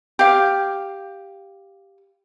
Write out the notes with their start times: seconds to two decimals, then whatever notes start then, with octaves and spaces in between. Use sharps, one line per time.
0.19 G4 F5